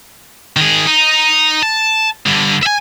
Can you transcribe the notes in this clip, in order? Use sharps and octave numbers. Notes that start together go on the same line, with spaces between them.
D#3 G#4
D#4
A5
G2 D3
E5 G#5